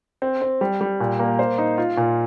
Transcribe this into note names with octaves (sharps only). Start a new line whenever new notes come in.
C4
C4
G3
G3
A#2
A#3
C5
D#4
F4
A#2